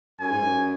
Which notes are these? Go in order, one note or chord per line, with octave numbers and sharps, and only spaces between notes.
F#2 G#5
G#2
F#2